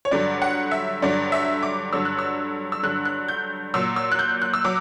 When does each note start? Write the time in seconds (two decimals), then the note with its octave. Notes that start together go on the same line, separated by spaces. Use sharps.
0.05 C#5
0.11 G2 D3 F#3 D5
0.42 F#5
0.71 E5
1.02 G2 D3 F#3 D5
1.32 E5
1.63 D6
1.93 G2 D3 F#3 E6
2.05 F#6
2.19 E6
2.72 E6
2.83 G2 D3 F#3 F#6
3.05 F#6
3.28 G6
3.74 A#2 F#3 E6
3.96 E6
4.12 F#6
4.19 G6
4.42 F#6
4.54 E6
4.64 F#3 D6